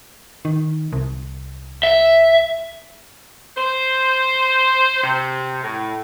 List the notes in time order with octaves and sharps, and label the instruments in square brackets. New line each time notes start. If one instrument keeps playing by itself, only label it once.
[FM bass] D#3
C2
[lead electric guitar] E5
[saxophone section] C5
C3
A2